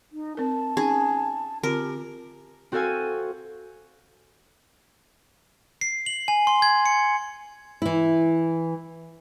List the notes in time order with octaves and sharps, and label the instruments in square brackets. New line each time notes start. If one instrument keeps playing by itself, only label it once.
[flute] D#4
[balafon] C4 A#4 [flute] A5
[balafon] C#4 D#4 [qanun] G#4
[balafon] D3 C4 F4 [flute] G4 [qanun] A#4
[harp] C4 F#4 A4 C5 F5 G#5
[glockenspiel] C7
F#7
G#5
C6
G#6
C#7
[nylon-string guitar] E3 E4